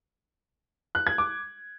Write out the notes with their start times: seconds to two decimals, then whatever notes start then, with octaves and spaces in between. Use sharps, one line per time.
0.95 F#6
1.07 G#6
1.18 D6